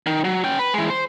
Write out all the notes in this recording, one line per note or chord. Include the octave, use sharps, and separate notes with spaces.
D#3
F#3
C#4 G5
B4
E3 G#3
C5